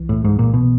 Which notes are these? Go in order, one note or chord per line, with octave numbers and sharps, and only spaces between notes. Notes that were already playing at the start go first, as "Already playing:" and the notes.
Already playing: C2 E3
A2
G#2
A#2
B2